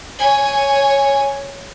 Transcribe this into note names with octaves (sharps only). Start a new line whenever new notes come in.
C#5 G#5